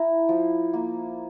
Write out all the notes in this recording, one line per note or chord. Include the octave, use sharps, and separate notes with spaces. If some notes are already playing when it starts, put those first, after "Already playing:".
Already playing: E4 A#5
F3
A#3